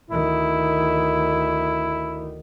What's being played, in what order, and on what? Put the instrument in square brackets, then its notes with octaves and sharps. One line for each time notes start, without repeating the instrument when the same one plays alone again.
[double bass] D2 D#3 [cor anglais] E4